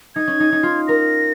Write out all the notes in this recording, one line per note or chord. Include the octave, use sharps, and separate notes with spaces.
D#4 G#6
C#4
D#4
D#4
F4
A#4 A#6